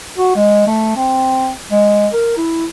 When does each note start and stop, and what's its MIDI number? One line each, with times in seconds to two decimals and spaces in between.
0.18 0.35 66
0.36 0.67 56
0.67 0.92 57
0.96 1.50 60
1.72 2.07 56
2.13 2.34 70
2.37 2.66 64